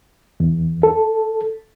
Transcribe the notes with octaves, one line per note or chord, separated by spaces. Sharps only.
E2
A4